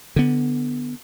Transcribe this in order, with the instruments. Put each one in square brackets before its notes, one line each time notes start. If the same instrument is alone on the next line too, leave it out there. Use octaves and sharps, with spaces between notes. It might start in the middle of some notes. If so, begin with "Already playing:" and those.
[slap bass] D3 B3